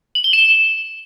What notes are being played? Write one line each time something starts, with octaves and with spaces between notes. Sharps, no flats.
F#7
G7
E7